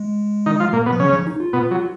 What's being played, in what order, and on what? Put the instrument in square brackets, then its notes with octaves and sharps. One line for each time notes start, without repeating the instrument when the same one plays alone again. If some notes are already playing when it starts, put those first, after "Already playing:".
Already playing: [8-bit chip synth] G#3
[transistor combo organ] D#3 D#4
F3 F4
A#2 A#3
B2 B3
[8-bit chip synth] F3
[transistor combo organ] C#3 C#4 [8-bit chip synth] F#3
[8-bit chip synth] F3
D#4
F4
[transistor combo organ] B2 B3
F#3